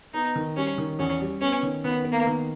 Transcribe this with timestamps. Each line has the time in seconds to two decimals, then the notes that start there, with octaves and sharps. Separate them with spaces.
0.14 B3 D#4
0.36 D#3
0.57 G3 C#4
0.78 D#3
0.99 E2 C#4
1.21 G3
1.41 B3 C#4
1.63 D#3
1.84 D#3 B3
2.05 B3
2.12 A#3
2.27 D#3